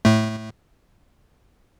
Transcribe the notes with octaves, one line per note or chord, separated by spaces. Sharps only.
A2 A3